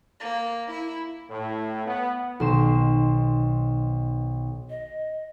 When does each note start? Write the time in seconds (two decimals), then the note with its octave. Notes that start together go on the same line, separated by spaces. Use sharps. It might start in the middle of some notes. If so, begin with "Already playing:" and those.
0.20 A#3
0.70 E4
1.30 A2
1.86 B3
2.40 B1 D#3 C5 E7
4.70 D#5